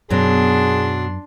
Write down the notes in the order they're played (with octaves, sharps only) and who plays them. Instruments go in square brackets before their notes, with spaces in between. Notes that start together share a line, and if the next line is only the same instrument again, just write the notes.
[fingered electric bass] F#2 [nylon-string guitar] B2 F#3 [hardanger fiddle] D4 C6 [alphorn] G#4